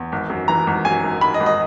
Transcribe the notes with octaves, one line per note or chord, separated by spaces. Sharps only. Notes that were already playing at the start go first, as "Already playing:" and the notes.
Already playing: E2
G#1
F#2
E3 A#5
G#1
F#2 G#5
G#1
G#1 B5
D#5
G#1
D#5